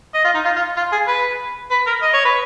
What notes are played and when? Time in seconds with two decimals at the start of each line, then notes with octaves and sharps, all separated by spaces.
0.14 D#5
0.24 F4
0.35 D#4
0.45 F4
0.56 F4
0.77 F4
0.92 G#4
1.07 B4
1.71 B4
1.87 A#4
2.02 D#5
2.13 C#5
2.25 B4